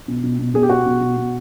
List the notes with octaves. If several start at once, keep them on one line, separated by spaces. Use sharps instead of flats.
B2
B2
B2
B2 G#4
G4
B2 F#4
B2
B2
B2